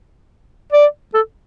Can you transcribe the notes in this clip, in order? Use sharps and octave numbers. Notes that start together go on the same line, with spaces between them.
D5
A4